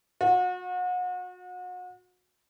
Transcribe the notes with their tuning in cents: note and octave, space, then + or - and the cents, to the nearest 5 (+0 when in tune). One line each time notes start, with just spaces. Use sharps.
F#4 -35